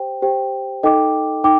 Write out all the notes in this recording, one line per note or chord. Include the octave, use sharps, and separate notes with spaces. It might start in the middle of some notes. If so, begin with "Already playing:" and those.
Already playing: G4 C5 G5
G4 C5 G5
D#4 A4 D#5 G5 D6
D#4 G5 D6